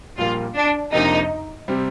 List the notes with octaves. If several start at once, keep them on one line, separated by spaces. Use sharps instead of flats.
A#1 A#2 G3 A#3 F4
D4
F2 C3 F3 A#3 D4 D#4
C3 G3 C4